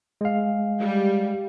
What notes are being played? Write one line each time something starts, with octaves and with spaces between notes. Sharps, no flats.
G#3 F5
G3